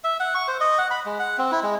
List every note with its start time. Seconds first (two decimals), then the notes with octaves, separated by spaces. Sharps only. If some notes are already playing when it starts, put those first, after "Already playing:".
0.04 E5
0.20 F#5
0.35 C#6
0.48 C5
0.60 D#5
0.78 F#5
0.91 B5
1.06 G#3
1.19 F#5
1.38 C4
1.52 E4
1.63 G#3